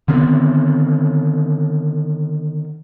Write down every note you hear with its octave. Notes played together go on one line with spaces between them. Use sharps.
D3 D#3 B3 C4